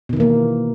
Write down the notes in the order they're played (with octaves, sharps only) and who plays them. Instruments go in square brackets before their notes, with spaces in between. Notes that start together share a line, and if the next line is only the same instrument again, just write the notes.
[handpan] B2
D#3
E3
A#3